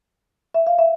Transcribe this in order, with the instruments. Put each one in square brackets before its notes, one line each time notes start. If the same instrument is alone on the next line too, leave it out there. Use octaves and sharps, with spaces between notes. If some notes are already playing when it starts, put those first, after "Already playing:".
[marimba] E5
F5
E5